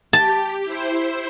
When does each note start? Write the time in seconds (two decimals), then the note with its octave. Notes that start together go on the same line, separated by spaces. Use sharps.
0.13 G4 A5
0.65 E4 C5